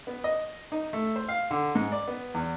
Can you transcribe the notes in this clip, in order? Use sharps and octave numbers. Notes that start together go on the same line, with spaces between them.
B3
D#5
D#4
A3
C5
F5
D3
G#2
D5
B3
E2